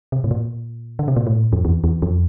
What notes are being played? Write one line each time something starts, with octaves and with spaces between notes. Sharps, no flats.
C3
A2
A#2
D3
C3
A#2
A2
F2
E2
E2
F2